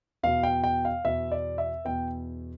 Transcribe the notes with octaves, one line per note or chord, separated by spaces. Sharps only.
E2 B2 F5
G5
G5
F5
E2 B2 E5
D5
E5
E2 B2 G5